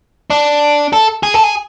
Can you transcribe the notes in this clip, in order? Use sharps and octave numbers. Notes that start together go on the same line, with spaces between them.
D4
A4
G#4
A4
G#4